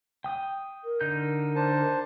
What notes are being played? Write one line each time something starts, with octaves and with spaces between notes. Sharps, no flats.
G5 D#6
A#4
D3 D#4 G6
D4 C5 A5